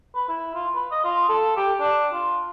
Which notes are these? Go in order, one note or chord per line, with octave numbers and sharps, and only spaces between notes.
B4
E4
F4
B4
D#5
F4
A4
G4
D4
F4